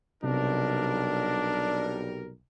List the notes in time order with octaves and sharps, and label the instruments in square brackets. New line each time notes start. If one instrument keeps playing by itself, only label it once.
[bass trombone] B1 [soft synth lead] C3 [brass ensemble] G3 A#4 [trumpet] D4